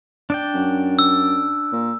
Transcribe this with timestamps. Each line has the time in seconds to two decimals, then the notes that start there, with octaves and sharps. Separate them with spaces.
0.30 D4 D5 G5
0.55 F#2
0.99 E6
1.73 A#2